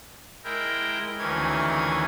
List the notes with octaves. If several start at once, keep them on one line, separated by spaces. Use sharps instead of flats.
G#3 E4 A#4 G5
D2 D#3 E3 C#4 G#6